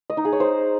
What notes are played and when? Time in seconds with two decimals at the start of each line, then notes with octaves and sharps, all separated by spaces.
0.10 D#5
0.17 D#4
0.25 G#4
0.33 C#5
0.40 C5